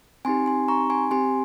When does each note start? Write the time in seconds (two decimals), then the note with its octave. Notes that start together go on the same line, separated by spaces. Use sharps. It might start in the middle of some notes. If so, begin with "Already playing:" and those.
0.25 C4 D#4 G4 G#5 C6
0.46 G#5 C6
0.68 A#5 C#6
0.90 G#5 C6
1.11 C4 G4 G#5 C6